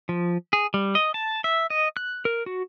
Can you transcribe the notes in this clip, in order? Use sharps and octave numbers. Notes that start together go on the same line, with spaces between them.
F3
G#4
G3
D#5
A5
E5
D#5
F#6
A#4
F#4